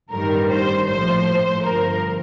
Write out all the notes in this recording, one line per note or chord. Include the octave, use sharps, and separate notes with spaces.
A1 G2 D#3 G3 A#4
C5
A#1 A2 F3 C5
G1 G2 F3 A#4